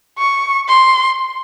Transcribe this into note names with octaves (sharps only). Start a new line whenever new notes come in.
C#6
C6